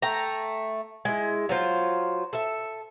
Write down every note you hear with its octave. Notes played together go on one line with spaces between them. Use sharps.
A3 G5 A#5
G#3 E4
F#3 F4 C5
A4 E5